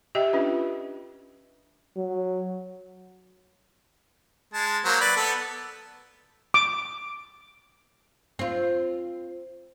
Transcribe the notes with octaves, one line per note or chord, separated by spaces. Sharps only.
G4 D#5 E5 G5
C#4 D4 F4 B4
F#3
G#3 A5
F#3 A#3 C5
B4 D5
B3 A4
D6
C4 F4